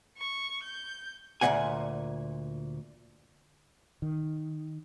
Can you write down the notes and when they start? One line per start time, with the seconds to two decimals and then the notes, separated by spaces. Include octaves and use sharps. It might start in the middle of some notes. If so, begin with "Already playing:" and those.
0.18 C#6
0.63 G6
1.41 D2 A#2 G#3 D4 F#5 G#5
4.02 D#3